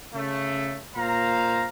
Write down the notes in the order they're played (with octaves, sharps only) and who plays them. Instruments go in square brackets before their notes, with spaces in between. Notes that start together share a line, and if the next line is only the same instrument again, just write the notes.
[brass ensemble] C#3 A3
A#2 C5 F5 A#5